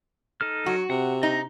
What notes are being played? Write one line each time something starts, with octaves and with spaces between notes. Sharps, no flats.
D#4 A4 F6
F#3 F#4
C3 F#5
D#4 D#5